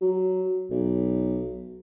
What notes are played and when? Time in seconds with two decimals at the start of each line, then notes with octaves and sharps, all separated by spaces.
0.01 F#3
0.70 B1